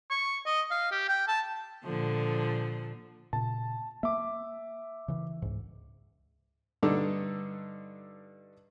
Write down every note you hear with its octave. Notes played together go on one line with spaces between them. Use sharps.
C#6
D#5
F5
G4
G5
A5
A#2 D3 F3
A#2 C#3 A5
A#3 E5 D6
C#3 E3
C#2 G#2
G2 D3 D4 D#4 A4